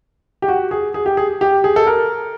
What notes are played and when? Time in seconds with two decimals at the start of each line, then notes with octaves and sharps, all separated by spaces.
0.42 G4
0.48 F#4
0.71 G#4
0.94 G#4
1.06 G4
1.17 G#4
1.41 G4
1.64 G#4
1.76 A4
1.87 A#4